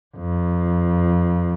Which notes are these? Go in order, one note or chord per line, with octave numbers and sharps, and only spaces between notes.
F2